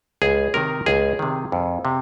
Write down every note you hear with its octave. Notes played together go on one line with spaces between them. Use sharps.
C#2 G#4
C3 D#3 A#4
C#2 G#4
C3 D#3
F2
C3